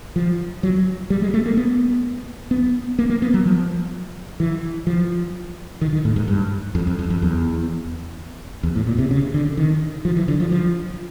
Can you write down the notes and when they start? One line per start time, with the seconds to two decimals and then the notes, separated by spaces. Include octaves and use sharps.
0.16 F3
0.63 F#3
1.10 G3
1.22 G#3
1.34 A3
1.46 A#3
1.57 B3
2.51 B3
2.99 A#3
3.10 A#3
3.22 B3
3.34 F#3
3.46 F3
4.40 E3
4.87 F3
5.81 D#3
5.93 D#3
6.05 A2
6.16 G#2
6.28 G2
6.75 F2
6.87 F2
6.99 F2
7.10 F2
7.22 E2
8.63 E2
8.75 A2
8.87 A#2
8.99 C3
9.11 C#3
9.34 D3
9.57 D#3
10.05 F3
10.17 E3
10.28 D3
10.40 F3
10.52 F3